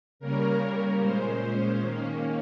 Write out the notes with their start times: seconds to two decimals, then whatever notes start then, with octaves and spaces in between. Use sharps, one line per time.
0.19 C#3 G3 A#3 C#4 A#4
0.99 A#2 G#3 C#4 C5
1.79 D#3 A#3 C#4